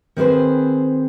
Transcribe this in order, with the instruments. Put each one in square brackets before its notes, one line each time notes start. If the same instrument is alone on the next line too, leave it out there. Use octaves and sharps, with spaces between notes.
[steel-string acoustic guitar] D#3 C4 G#4 B4 C5